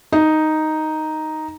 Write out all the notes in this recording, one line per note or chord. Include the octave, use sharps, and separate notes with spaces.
D#4